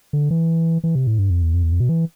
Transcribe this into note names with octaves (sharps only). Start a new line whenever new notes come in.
D3
E3
E3
C3
A2
G2
F2
E2
F2
E2
F2
B2
E3